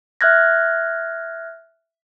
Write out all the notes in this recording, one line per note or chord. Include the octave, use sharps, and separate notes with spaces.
E5 F6 F#6 G#6 A#6